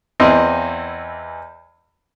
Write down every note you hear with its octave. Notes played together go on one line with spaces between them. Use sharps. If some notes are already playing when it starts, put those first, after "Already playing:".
E2 E3 C4 D#5